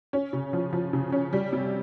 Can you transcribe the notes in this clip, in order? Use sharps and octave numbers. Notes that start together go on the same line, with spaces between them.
C#4
C#3
F3
F3
C#3
C#4
G3
C3